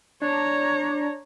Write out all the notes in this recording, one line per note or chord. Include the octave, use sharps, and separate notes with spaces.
D4 C#5 A#5